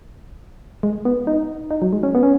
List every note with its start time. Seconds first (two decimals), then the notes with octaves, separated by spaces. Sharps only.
0.83 G#3
1.05 B3
1.27 D#4
1.71 D#4
1.82 F#3
1.93 G#3
2.03 C#4
2.15 B3
2.23 C#4